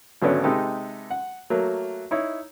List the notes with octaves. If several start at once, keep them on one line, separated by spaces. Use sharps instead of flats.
G#1 D3 F#3 B3 C#4 D5
C3 G#3 D#4 G4 A4 B4
F#5
F#3 A3 A#3
D#4 E4 C#5